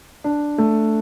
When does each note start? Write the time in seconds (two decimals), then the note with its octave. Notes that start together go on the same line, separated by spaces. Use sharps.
0.24 D4
0.58 A3